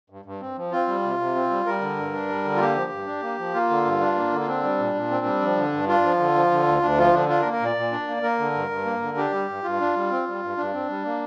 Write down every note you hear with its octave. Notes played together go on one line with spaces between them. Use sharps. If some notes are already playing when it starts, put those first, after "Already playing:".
G2
G2
C4
F3
C4 F4
G3
C3
C3
C4
G3
G3 A#4
D3
G2
D4
G3
D3
F4
A#3 G4
F3
G2
D4
A#3
F3
A#3 F4
D3
G2
D4
A#3
D3
F4
C4 D4
G3
A#2
A#2
C4
G3
F3
D3
G2
D4 F4
F3
D3
F3
D3
D2
D2 D4
F3 F4
D3 D4
D4 F4
A#4
A#3
A#4
A#2 D5
A#2
D4
A#3
A#3 A#4
D3
G2
G2
A#3
D3
D4 G4
G3
G2
G2 F4
D4
G3
C4
G3
G2
G2 D4
C4
G3
A#3